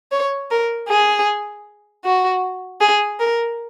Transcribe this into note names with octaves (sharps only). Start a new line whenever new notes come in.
C#5
A#4
G#4
F#4
G#4
A#4